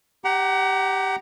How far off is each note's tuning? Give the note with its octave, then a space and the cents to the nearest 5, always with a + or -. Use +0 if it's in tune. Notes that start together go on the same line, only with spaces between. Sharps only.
G4 +0 F#5 +35 A#5 +0